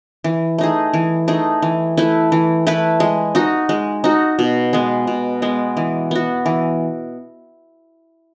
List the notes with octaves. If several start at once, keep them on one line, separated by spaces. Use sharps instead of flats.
E3
A3 D#4 G#4
E3
A3 D#4 G#4
E3
A3 E4 B4
E3
A3 E4 B4
G#3
D#4 F#4
G#3
D#4 F#4
B2
G#3 B3
B2
G#3 B3
E3
B3 F#4
E3